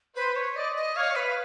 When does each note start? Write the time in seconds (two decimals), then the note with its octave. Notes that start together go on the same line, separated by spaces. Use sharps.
0.16 B4 C5
0.36 C#5
0.56 D5 D#5
0.76 D#5
0.96 C#5 F5
1.16 B4